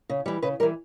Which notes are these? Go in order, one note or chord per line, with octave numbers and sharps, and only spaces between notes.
C#3
E3 G3
C#3 B4
E3 G3 A#4